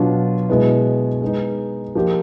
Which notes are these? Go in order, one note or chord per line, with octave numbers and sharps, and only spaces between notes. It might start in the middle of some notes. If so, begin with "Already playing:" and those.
Already playing: B2 F#3 B3 D4 F4
B2 G#3 B3 E4
G#3 B3 D#4
F3 A#3 D#4 G4